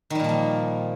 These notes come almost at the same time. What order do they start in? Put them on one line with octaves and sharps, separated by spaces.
D#3 G3 A#2 F3 A#3